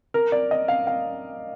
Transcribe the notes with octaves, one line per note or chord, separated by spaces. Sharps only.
A#4
D5
D#5
F5
F5